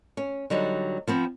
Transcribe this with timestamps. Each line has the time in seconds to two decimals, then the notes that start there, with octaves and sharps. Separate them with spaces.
0.17 C#4
0.50 D3 F#3 G3 D#4
1.08 F3 B3 C4